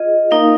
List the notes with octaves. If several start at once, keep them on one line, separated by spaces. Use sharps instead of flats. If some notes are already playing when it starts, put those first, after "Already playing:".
Already playing: F4 G#4 D#5
A#3 D#4 A#4 F5